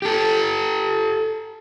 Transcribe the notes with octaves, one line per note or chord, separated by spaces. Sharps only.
G4 A4